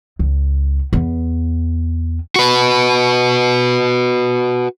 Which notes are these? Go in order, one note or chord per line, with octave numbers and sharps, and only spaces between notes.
C#2
E2 B3
F#4 B4